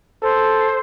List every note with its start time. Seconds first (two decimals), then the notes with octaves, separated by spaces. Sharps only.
0.23 A4 C5